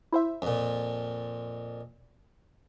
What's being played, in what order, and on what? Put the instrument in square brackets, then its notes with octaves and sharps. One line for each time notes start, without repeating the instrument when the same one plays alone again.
[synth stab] E4 C5 E5
[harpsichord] F2 A#2